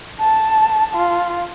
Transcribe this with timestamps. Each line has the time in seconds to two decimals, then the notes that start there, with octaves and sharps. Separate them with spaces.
0.20 A5
0.96 F4